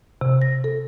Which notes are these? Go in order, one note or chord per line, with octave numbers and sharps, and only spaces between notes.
C3
A#6
A4